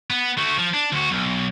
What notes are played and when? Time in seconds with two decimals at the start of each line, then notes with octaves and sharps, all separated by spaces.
0.10 B3
0.37 A3 F#4
0.56 F3
0.74 D4
0.92 D2 F#4
1.12 B1